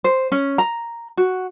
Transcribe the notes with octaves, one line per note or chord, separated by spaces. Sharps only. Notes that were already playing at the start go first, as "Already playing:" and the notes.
C5
C#4
A#5
F#4